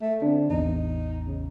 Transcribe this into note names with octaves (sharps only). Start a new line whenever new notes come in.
A3
D3 C4 D4
A1 E2 D#4
C#3